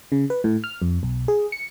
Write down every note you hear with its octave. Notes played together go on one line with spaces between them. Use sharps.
C#3
B4
A2
F6
F2
B1
G#4
C#7